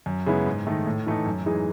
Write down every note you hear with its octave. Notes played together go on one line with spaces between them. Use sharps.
F#2
C#3 G#3 B3 E4
G#2
D#3 A3 D#4
A2
E3 A3 D#4
F#2
E3 G#3 D#4 G#4